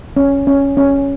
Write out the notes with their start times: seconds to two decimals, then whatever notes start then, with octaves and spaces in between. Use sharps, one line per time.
0.17 C#4
0.47 C#4
0.77 C#4